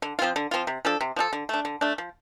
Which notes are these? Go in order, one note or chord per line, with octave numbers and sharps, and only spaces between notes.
D3
F3 C4 F4
D3
F3 C4 F4
C3
F3 D4 A4
C3
F3 D4 A4
D3
A3 D4
D3
A3 D4
F3